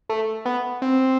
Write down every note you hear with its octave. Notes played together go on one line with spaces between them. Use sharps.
A3
B3
C4